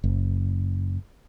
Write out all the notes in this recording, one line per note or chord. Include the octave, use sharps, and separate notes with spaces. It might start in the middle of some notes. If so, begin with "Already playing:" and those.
F#1